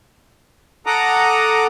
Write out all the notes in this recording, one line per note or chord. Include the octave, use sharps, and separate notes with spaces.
A4 F#5 A#5 D6 D#6